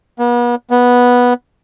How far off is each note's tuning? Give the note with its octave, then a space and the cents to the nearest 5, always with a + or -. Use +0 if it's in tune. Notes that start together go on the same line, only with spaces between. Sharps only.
B3 -40
B3 -10